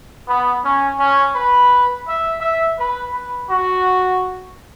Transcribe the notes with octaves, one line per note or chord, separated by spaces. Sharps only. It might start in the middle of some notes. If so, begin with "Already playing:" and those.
B3
C#4
C#4
B4
E5
E5
B4
B4
F#4